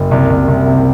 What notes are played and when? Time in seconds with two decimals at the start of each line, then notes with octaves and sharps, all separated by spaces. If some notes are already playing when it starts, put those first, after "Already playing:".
Already playing: F#1
0.11 C2
0.30 C2
0.48 C2
0.66 C3